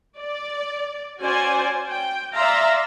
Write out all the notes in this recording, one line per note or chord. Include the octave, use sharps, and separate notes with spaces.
D5
C#4 F#4 C5 D5 G#5
G5
D5 E5 F5 A#5 C6